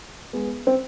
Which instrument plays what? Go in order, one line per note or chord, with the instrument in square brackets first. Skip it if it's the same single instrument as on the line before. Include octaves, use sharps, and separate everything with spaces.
[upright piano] G#3 B3
C4